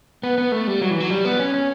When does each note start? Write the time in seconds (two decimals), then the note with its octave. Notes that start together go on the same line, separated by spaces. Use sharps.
0.23 B3
0.38 B3
0.52 A3
0.67 G3
0.82 F#3
0.91 E3
1.00 F#3
1.11 G3
1.25 B3
1.39 C#4
1.54 C#4